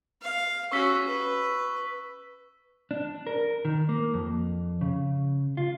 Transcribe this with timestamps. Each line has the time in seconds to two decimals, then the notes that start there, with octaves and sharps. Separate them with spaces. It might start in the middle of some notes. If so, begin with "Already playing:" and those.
0.22 F5
0.72 C#4 F#4 C#6 E6 B6
1.07 B4
2.91 D4
3.27 A#4
3.65 D#3
3.89 A#3
4.14 F2
4.81 C#3
5.57 F4